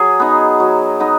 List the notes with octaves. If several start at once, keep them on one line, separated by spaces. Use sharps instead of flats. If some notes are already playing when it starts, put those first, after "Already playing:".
Already playing: F#3 G#4
B3 D#4
F#3
B3 D#4